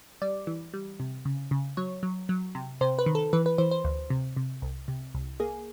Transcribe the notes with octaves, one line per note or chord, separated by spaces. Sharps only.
G3 D5
E3
G3
C3
C#3
C#3
F#3 C#5
F#3
F#3
C3
C3 C5
B4
D#3
A4
E3 B4
B4
E3 C5
C5
D2
C3
C3
C2
C3
C2
A#3 G#4